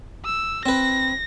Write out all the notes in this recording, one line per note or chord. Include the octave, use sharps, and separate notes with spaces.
E6
C4 B4 A#6